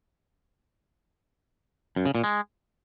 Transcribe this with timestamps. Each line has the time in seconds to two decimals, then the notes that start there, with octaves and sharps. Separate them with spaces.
1.96 F#2
2.06 C#3
2.15 A#2
2.24 G#3